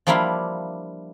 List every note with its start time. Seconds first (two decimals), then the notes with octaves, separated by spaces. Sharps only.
0.07 F3 G3 A#3 D4 E4 F4